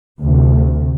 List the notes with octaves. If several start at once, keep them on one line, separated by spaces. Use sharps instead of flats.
D2 C3